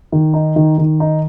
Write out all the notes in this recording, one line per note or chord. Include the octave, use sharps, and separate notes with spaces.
D#3
D#4
D#3
D#3
D#4